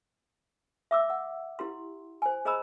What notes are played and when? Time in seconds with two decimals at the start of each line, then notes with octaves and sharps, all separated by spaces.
0.91 E5 D6 E6
1.10 F#5
1.59 E4 G4 C6
2.22 C5 G#5
2.45 G#4 C5 D#5 A#5 B5 E6